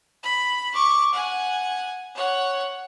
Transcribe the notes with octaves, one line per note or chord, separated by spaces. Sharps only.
B5
C#6 D6
F#5 G#5
C#5 F#5